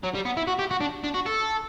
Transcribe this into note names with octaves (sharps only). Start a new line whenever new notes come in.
F#3
G3
B3
E4
F#4
G4
F#4
D4
D4
F#4
A4